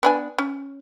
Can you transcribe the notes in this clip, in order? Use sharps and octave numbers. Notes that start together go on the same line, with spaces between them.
B3 D4 G#5
C#4